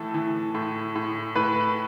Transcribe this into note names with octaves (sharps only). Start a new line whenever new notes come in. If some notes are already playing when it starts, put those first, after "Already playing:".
Already playing: A2 E3 A4 A5
E3
A2
A2
A2 B4 B5